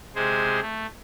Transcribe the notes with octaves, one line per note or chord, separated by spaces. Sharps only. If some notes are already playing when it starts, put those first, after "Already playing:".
C3 G#3 G#4 C5
A3